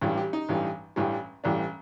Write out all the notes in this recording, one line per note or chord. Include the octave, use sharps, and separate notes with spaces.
A1 G2 E3 G3
G4
D#4
A1 G2 E3 G3
A1 G2 E3 G3
A1 G2 E3 G3 D4